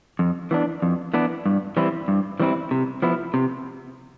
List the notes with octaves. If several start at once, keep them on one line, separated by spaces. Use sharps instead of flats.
F2
E3 B3 D4
F2
E3 B3 D4
G2
E3 G3 C4 E4
G2
E3 G3 C4 E4
C3
F3 B3 E4
C3